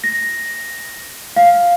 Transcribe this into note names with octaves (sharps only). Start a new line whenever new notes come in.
A#6
F5